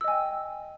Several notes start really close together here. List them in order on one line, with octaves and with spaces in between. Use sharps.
E6 D#5 G#5 G5